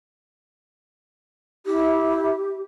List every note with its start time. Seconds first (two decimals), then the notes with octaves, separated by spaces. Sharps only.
1.66 E4 G4